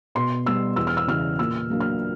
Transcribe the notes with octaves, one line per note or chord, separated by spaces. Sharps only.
B2 C6
G3 B3 E6
E2 E6
F6
E6
C#3 E3 F6
A#2 E6
F#3 A#3 D4
F6